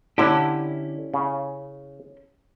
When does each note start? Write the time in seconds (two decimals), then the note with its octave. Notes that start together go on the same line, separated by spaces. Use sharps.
0.18 D3 C#4 E4 G4
1.14 C#3